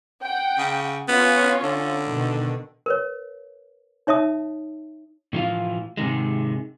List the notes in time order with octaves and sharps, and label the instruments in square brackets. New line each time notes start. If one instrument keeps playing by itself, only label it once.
[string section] F#5 G5
[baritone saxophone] C#3
[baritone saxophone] B3 [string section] C#4 F4 C#5
[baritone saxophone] D3
[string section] B2 D#3
[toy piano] A#4 B4 C#5
D#4 C#5 E5 A5 D#6
[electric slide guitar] A2 E3 F3 B3 F4 F5
G#2 C3 D#3 G#3